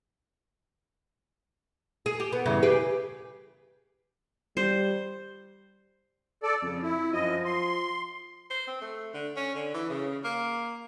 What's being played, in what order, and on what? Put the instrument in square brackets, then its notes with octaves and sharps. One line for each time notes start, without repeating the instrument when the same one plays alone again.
[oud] G#4
G4
B3
E2 G2 C#3
G4 G#4 B4
[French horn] G3 [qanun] C5
[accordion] A4 D5
[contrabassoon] F2 [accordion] C#3
[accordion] E4
[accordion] F#2 D#5 [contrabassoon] F3
[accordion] C6
[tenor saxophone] C5
C4
A3
D3
C#4
D3
E3
C#3
A#3